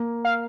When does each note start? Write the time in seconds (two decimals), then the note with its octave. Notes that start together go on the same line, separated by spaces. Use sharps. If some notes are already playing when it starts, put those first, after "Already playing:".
Already playing: A#3
0.25 F5